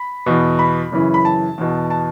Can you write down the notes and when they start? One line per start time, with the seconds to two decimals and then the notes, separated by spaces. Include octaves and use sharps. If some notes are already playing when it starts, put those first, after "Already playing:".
Already playing: B5
0.26 E2 B2
0.59 B5
0.92 F#2 C#3 E3
1.14 B5
1.25 A5
1.58 E2 B2
1.90 A5